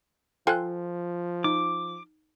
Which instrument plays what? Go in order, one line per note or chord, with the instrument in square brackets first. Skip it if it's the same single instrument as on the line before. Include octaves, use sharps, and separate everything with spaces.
[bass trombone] F3 [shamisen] F4 A4 C5 [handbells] G5 G#5 F#6
[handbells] D#4 [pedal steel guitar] D6